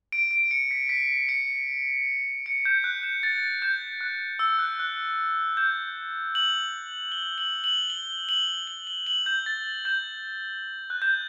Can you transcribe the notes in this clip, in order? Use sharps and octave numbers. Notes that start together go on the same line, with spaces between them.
D7
D7
C#7
B6
B6
C#7
C#7
G6
F#6
G6
A6
G6
F#6
E6
F#6
F#6
G6
F#7
G7
F#7
F#7
G7
F#7
G7
G7
F#7
G6
A6
G6
F#6
G6